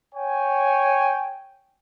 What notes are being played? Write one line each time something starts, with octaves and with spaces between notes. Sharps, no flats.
C#5 G5 G#5